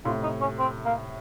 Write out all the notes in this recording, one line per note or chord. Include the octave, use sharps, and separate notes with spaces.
A2 C3 F4
D#4
C#4
C4
A#3